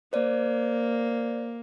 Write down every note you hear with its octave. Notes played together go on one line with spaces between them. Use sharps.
A#3 C5 D5